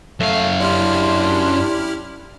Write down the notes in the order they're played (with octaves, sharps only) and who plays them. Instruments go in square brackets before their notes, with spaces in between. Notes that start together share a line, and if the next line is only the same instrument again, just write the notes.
[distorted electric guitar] F#2 F5 [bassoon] A3
[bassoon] D4 [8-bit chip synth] E4 G4 F6 [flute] C6